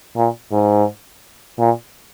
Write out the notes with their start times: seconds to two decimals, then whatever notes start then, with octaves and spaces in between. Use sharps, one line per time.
0.16 A#2
0.52 G#2
1.59 A#2